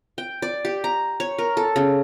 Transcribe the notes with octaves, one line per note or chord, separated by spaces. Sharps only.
G5
D5
G4
A#5
C#5
A#4
A4
C#3